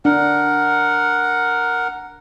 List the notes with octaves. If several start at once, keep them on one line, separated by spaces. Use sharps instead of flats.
D4 A#4 F#5